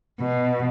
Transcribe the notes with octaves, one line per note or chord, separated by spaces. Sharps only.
B2